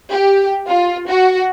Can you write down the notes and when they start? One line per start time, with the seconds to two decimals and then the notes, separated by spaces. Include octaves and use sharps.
0.10 G4
0.67 F4
1.08 F#4